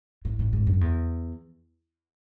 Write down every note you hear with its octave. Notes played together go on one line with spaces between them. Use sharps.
A2
A2
G#2
F#2
E2